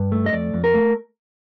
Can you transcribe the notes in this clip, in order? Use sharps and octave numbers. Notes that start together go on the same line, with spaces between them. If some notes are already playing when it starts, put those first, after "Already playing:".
Already playing: G2
A3
D#5
F2 D5
F2
A#4
A3